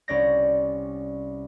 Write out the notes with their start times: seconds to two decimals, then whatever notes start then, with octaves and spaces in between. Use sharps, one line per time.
0.08 C2 C#4 C#5 D5 G6 A#6